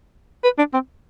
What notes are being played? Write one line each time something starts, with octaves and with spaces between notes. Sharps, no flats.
B4
D4
C4